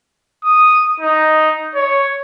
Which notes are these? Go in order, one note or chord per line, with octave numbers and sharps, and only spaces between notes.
D#6
D#4
C#5